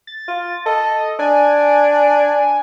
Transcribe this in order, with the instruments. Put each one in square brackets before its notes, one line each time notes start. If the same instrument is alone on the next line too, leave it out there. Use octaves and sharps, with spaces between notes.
[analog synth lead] A6
[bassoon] F4
[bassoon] A4 [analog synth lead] D#5
[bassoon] D4 [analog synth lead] G#5